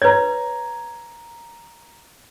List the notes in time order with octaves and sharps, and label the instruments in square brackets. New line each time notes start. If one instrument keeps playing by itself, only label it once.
[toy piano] B4 C#5 [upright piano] A#5 G#6